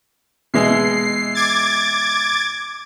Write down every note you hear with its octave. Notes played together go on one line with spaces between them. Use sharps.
B2 E3 G#3 C7
D6 G#6 A6